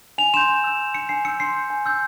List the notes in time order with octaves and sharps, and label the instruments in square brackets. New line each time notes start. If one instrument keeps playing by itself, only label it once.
[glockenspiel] G#5 F7
C6 G6 E7
G#5
E6 G6
C6
G6 C#7
G#5 C7
E6 C#7
G6
C6 C7
G6
G#5
E6 G6